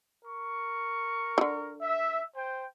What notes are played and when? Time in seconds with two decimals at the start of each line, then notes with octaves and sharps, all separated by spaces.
0.25 A#4 C#6
1.38 D3 E3
1.81 E5
2.36 C5 G5